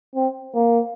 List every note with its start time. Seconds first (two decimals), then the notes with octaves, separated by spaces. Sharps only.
0.15 C4
0.55 A#3